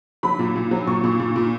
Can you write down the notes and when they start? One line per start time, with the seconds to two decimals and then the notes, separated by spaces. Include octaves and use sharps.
0.23 F#3 B5
0.39 A#2
0.56 A#2
0.71 F#3
0.87 A#2 C#6
1.04 A#2
1.20 A#2
1.36 A#2